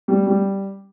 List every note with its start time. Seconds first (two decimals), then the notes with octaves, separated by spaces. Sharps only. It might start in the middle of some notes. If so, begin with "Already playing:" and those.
0.08 G3
0.27 G3